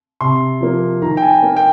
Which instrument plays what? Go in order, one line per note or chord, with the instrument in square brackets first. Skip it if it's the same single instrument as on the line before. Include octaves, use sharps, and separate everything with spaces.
[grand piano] C3 C6
F3 A#3
D#3 A#5
G5
G#5
A#3
G5